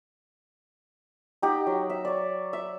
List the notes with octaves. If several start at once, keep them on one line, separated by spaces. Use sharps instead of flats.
D#4 G4 F#5
F#3
E5
C#5 D5
E5